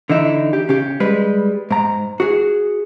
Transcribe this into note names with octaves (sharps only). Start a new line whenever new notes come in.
D3 E3 D#4 E4
G4
C#3 G4
G3 G#3 B4
G#2 A#5
F#4 G#4